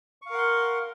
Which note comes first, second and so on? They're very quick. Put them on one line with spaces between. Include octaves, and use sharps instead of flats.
C#6 F5 A#4 F#5 C6